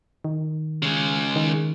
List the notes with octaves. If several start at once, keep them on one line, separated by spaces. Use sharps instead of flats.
D#3
C#3 G#3
D#3